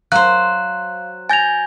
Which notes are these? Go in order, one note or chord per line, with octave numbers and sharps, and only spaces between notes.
F#3 C5 F5 F#6
G#5 G6 A6 A#6 F7